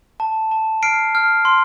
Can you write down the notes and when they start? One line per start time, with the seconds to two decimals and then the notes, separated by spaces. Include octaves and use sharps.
0.20 A5
0.51 A5
0.83 F6 C7 D7
1.15 F6
1.45 C6